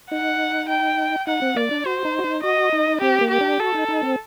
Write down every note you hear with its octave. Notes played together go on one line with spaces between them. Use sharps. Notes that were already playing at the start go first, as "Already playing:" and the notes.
D#4 F#5
G5
D#4 F#5
C4
A#3 D5
D4
F#4 C5
D#4
F#4
D#4
F#4 D#5
D#4
C4 G4
A#3
G4
D4
F#4 A4
D#4
D#4
C4